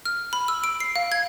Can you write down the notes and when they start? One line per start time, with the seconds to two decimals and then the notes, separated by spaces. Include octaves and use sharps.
0.05 F6
0.33 B5
0.48 E6
0.64 D7
0.80 C7
0.96 F5
1.12 G#6